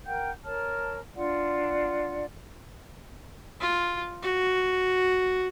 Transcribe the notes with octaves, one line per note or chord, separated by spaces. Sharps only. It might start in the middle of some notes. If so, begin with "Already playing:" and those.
A#4 F#5 G5 G6
A#4 C#5 A5 F6
D4 F4 D5 F#5
F4
F#4